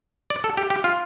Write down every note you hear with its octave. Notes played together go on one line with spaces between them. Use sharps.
D5
A4
G4
G4
F4